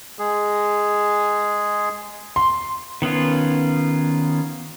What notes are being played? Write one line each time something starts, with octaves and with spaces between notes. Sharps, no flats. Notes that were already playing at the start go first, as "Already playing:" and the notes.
G#3 G#4
C6
D#3 B3 C#4 F4